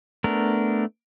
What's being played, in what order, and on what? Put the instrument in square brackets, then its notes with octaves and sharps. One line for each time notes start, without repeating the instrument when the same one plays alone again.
[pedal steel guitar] A3 B3 D4 A#4